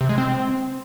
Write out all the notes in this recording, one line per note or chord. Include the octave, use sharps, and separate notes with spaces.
C3
G#3
C4